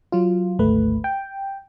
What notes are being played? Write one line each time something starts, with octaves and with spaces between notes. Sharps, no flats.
F#3 F4
G#1 D2 A3 B4
G5